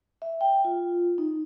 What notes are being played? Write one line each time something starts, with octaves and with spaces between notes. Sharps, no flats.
E5
G5
F4
D#4